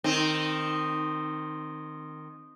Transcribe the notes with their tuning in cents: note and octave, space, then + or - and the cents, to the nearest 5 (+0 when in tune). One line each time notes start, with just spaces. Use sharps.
D#3 -10 C4 +0